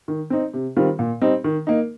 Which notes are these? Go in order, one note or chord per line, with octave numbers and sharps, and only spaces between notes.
D#3
C4 D#4
C3
D#3 G3 C4 F4
A#2
G3 C4 D#4
D#3
A#3 D#4